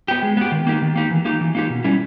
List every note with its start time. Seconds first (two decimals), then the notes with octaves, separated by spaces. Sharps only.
0.08 B3 G4
0.23 G#3
0.37 B3 G4
0.52 D#3
0.67 A#3 D#4 G4
0.82 D#3
0.96 A#3 D#4 G4
1.11 E3
1.25 A#3 D#4 G4
1.41 E3
1.55 A#3 D#4 G4
1.70 B2
1.84 G3 C#4 E4